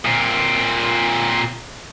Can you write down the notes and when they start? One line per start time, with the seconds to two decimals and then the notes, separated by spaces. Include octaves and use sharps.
0.05 A#2 C4